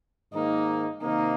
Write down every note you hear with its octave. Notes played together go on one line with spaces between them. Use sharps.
G#2 D#3 A#3 D#4
C3 D#3 A#3 D#4